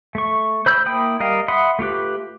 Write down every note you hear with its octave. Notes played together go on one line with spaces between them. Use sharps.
A3 C#6
C5 B5 E6 G6
A#3 E4 G5 B5 D#6
G3 A#4 D#5 F5
E5 F#5 B5 C6 D#6
A3 F4 G4 B4